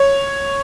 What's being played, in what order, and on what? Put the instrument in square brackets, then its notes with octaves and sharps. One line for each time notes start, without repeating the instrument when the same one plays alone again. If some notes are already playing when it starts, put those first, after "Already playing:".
Already playing: [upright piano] C#5